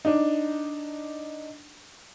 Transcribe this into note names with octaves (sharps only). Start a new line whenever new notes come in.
D4 D#4